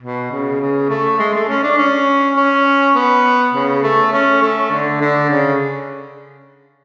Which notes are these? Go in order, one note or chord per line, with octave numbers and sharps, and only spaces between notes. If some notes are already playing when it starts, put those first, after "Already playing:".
B2
C#3
C#3
A3
G#3
A3
C#4
D4
C#4
C#4
B3
C#3
A3
C#4
A3
D3
D3
C#3